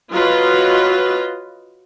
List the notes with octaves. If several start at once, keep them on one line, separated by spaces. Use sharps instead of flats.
F#3 F4 B4 D#5